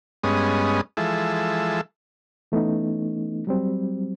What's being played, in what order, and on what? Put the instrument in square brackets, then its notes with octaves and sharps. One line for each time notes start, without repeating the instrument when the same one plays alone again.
[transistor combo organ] G2 G#3 B3 C#4 D#5
E3 F3 G#3 A4 E5
[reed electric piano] E3 A3 B3 C#4 D#4
F#3 G3 C4